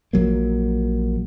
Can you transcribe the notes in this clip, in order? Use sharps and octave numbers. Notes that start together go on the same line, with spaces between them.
A#1 F#3 A#3